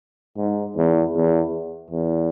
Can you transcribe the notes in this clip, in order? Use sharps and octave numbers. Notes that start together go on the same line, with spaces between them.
G#2
E2
E2
E2